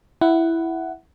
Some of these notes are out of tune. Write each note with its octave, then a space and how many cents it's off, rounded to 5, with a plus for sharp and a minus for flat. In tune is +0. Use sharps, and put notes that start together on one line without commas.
E4 +0 F#5 +10